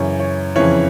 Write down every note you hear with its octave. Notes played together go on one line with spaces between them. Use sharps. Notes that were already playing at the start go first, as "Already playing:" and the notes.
Already playing: F#2 C#3 E3 C#5
C#5
F2 C#3 E3 C#5